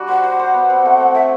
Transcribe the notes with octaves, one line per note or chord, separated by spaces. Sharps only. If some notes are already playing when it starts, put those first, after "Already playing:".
Already playing: G3 D4 F#4
C5 F#5
C5
C5
B3
C4
A3
C4
A3 E5